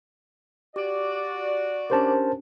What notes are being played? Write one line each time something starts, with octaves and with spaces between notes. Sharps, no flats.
F#4 G4 D5 D6
C#4 D4 G4 A#4 C5 A5